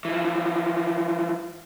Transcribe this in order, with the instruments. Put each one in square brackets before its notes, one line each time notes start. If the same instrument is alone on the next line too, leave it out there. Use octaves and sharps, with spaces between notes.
[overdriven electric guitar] E3 F3